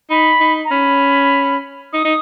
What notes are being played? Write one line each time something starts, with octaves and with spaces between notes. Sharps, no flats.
D#4 B5
D#4
A#5
C#4 B5
D#4 D#6
D#4